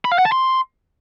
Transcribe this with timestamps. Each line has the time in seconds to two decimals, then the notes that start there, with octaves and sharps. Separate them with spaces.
0.05 B5
0.12 F5
0.18 F#5
0.25 A5
0.32 C6